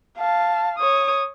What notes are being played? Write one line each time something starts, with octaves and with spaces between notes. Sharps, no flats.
F5 A5
C#5 D#6